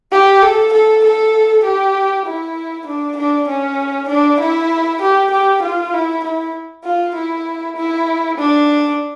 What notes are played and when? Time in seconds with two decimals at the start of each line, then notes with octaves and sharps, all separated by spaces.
0.12 G4
0.42 A4
0.74 A4
1.04 A4
1.65 G4
2.26 E4
2.87 D4
3.17 D4
3.49 C#4
4.09 D4
4.41 E4
5.02 G4
5.31 G4
5.63 F4
5.94 E4
6.24 E4
6.84 F4
7.16 E4
7.77 E4
8.38 D4